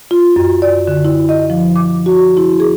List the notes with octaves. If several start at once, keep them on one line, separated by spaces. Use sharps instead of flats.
F4
F#2
D5
D3
E4
D#5
F3
D6
F#4
E4
G#4